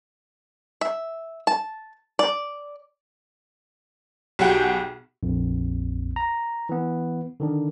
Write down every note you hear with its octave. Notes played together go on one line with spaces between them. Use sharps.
E5
A5
D5
B1 G3 F#4 G#4 F#5 G5
A#1 F2
A#5
E3 B3
D3 D#3 D4